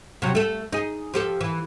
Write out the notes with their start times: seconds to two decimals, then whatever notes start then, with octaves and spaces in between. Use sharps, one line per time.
0.22 C3 F#3
0.35 A3 A4
0.73 D#4 G#4
1.14 F3 G4 A4
1.41 E3